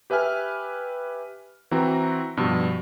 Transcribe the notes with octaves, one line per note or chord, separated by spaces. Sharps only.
G4 B4 E5 G#5 F6
E3 C4 F#4 A#5
G2 B2 F3